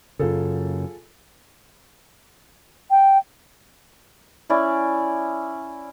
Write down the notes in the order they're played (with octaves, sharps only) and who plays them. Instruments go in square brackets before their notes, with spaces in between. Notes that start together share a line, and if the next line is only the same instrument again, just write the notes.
[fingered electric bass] F#2 C#3 [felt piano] F4 G#4 A4
[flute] G5
[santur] C#4 E4 D5